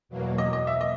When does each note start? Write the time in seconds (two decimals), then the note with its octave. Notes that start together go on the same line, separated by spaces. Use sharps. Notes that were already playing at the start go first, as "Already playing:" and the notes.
0.09 E2 B2 F#3 A#3
0.38 D#5
0.53 D#5
0.67 E5
0.81 D#5